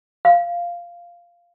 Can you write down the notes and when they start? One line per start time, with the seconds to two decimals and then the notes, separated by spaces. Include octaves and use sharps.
0.25 F5